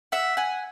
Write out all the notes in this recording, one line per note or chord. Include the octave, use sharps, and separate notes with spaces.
E5 F#5
F#5 G#5